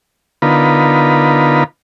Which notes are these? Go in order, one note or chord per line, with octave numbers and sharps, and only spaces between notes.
D3 B3 D#4 F4 A#4 B4